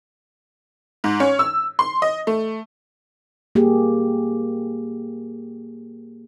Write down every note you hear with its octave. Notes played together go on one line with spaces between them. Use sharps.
G#2
C#4
E6
C6
D#5
A3
A#3 G4 G#4